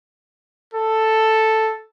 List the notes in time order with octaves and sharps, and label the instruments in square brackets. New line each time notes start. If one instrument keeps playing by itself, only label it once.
[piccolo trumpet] A4